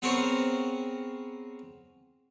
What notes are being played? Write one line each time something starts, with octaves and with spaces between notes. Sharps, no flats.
B3 C4 G#4 A#4 C5 C#5